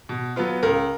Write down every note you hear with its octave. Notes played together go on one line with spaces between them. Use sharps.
B2
F#3 B3 F4
C#2 A#4